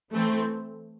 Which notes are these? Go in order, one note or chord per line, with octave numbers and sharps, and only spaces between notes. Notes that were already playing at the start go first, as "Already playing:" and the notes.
E3 A3 C4